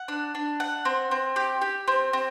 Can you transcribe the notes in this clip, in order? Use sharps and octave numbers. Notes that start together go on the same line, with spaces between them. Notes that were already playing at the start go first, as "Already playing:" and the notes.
Already playing: F#5
D4
D4
F#5
C4
C4
G4
G4
C4
C4